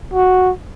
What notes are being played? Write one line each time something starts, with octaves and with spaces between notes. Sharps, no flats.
F#4